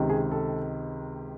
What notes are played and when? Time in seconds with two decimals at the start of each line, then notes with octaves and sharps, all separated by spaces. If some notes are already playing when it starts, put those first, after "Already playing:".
Already playing: C#2 C3 D#3
0.09 G#4
0.32 A4